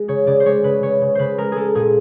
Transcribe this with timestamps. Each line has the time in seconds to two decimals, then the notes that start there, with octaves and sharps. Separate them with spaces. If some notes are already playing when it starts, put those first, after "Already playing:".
Already playing: G#3
0.08 C#3 C#5
0.27 C#3 D5
0.40 C5
0.46 G#3 C#5
0.64 C#3 B4
0.83 C#3 C#5
1.01 C#3
1.15 C#3 B4 C5
1.38 G#3 A#4
1.52 G#3 G#4 A4
1.75 A#2 G#4